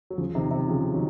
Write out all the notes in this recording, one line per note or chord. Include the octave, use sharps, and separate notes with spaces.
F#3
C#3 F3
C3 D#3
C3 D#3
C#3 F3
D#3 F#3